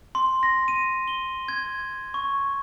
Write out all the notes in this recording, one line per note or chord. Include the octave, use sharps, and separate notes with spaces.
C6
A#6
D#7
G7
G#6
C#6